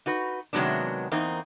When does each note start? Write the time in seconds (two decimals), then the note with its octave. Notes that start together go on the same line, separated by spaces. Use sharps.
0.06 D#4 F#4 B4
0.53 C3 D#3 F#3 G#3 B3 D4
1.12 E2 A#3 C4 D#4